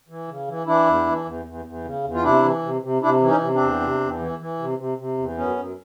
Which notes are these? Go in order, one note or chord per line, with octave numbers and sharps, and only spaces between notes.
E3
C#3
E3
E3 D4 E4
E2
E3
E2
E2
E2
C#3
E2
F4
C3 D4 E4
E3
C3
C3
C3 D4 E4
E3
C#4 D#4
C3
C4 D4
E2
C3
E2
E3
E3
C3
C3
C3
E2
F#2 B3 C#4
F#2